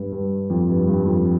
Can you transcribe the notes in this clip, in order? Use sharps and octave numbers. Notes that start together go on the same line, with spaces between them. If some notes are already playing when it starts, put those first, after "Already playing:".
Already playing: G2
G2
F2
G2
G2
F2